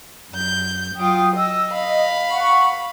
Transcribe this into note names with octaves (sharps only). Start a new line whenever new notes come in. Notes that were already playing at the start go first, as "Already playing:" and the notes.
F#2 G6
F#3 F4 G5 D#6
D#5 E6
D#5 F5 B5
F#5 C#6